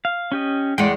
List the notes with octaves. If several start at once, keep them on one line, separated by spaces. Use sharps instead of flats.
F5
C#4 G4 D#5
E2 G#3 D5 F#5 G5